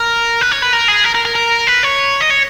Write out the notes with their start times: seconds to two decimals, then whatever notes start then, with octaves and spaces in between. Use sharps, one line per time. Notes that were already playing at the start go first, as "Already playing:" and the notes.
Already playing: A#4
0.41 B4
0.52 C#5
0.62 B4
0.73 A#4
0.88 G#4
1.05 A#4
1.15 A#4
1.25 A#4
1.35 A#4
1.67 B4
1.83 C#5
2.21 D#5
2.30 C#5